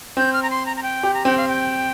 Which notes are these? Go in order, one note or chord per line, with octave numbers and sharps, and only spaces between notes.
C4 G6
F6
A#5
C6
A#5
A#5
G5
G4
A#5
C4 G5
F5
G5